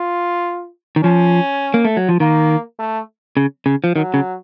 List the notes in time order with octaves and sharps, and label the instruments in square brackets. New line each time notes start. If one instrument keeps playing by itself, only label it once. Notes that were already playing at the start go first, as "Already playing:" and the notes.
Already playing: [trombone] F4
[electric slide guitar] D#3
[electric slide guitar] F3 [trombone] C#4
[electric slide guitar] A#3
A3
F#3
F3
[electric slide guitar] D#3 [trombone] A#3
[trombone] A3
[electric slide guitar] C#3
C#3
F3
[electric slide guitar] D#3 [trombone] F#3
[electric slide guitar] C#3